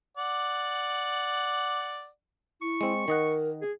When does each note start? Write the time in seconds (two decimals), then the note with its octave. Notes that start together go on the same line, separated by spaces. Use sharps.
0.17 D5 F#5
2.62 E4 C#6
2.81 G#3 C4
3.08 D#3 A#4 D#5 F#5
3.62 G#4